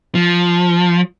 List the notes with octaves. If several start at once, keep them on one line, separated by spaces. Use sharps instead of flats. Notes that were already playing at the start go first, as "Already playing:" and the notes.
F3